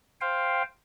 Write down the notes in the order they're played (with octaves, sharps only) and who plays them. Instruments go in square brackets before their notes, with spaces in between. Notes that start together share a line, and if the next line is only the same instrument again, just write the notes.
[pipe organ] C5 F5 G5